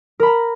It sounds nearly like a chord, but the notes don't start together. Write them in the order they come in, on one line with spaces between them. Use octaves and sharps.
A#4 B5 A#5